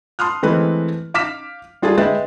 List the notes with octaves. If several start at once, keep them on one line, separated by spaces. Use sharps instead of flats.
A5 C6 D#6 F6 F#6
E3 G#3 A3 C4 B4
F5 D6 F6 B6 E7
G3 F4 G#4 A4 A6
G#3 B4 E5 G5 A6